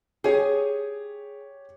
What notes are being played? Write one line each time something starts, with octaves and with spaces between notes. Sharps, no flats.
G4 G#4 C#5